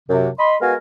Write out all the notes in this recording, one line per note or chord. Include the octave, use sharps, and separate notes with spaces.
F#2 C3
D#5 B5 C6
G#3 B3 F#4 A#4 F5 G#5